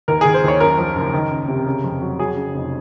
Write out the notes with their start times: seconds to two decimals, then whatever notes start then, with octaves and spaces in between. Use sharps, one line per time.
0.08 D#2 A#4
0.21 D#2 G#4
0.34 C5
0.44 D#2 C#5
0.60 F#2 A#4
0.78 F3
0.96 F#1
1.14 D#3
1.31 C#2
1.48 C3
1.66 C#3
1.84 F2
2.02 F#3
2.19 F#3 G#4
2.36 C#3
2.54 F1